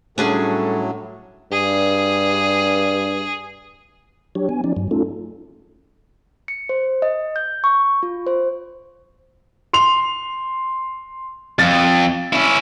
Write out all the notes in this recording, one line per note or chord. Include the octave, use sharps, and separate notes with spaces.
A2 F#3 G3 C#4 D4 F#4 G#4 A4
G2 G#4
F#3 D4 G4 C#5
B3 G#5
F3 C#4 D#4 D5
G2 F#3
A3 C#4 D#4 F4 A4
C#7
C5
D#5
G6
C#6
F4
C5
C6 F7
F2 A6
C#4 E4